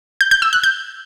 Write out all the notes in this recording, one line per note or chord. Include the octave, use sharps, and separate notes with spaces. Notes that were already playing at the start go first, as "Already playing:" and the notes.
G6
G6
E6
F#6
G6